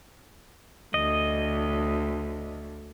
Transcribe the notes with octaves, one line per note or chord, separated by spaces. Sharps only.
D2 D#5